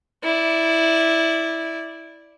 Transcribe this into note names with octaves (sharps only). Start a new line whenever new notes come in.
E4 D5